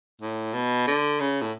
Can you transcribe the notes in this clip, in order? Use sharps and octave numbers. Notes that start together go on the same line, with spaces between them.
A2
B2
D3
C#3
A2